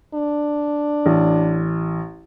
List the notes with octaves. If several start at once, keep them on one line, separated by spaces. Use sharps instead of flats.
D4
A1